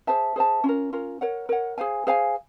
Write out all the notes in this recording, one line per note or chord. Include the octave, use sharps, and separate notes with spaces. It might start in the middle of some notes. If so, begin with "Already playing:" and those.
G#4 C5 E5 A5
G#4 C5 E5 A5
C#4 F4 A#4
C#4 F4 A#4
A#4 C#5 F#5
A#4 C#5 F#5
G#4 C5 F5 G#5
G#4 C5 F5 G#5